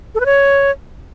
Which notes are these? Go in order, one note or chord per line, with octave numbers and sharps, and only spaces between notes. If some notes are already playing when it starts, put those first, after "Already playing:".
A4
B4
C#5